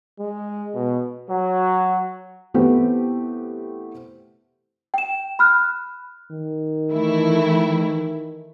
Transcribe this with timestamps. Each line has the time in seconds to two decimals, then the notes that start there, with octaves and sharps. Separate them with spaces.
0.20 G#3
0.74 B2
1.29 F#3
2.54 E3 A3 B3 C4 E4 G4
4.94 G5 E7
5.39 B5 F6 F#6
6.31 D#3
6.92 E3 A3 E4